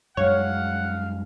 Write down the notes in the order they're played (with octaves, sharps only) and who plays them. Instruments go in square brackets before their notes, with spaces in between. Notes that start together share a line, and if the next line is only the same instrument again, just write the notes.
[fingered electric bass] F#2 G3 G#3 [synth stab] C#5 [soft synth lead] F5 [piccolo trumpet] F#5